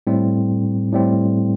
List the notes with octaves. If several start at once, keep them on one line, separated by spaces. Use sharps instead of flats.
A2 G3 C4
A2 G3 C4